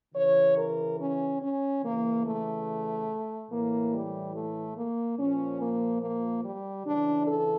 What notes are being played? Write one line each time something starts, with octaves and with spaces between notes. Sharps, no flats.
C#3 E3 C#5
A#4
C#4
C#4
C#3 E3 A#3
A3
A2 E3 A#3
G3
A3
A#3
A#2 F3 C#4
A#3
A#3
G3
C#3 E3 D4
A4